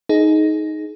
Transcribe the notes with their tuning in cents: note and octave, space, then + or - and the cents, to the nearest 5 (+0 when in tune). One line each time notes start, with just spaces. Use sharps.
D#4 +5 G#4 +25